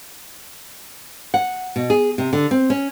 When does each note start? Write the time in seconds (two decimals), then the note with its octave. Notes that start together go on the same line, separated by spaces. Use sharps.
1.34 F#5
1.76 B2
1.90 G#4
2.18 C3
2.33 D3
2.51 C4
2.70 C#4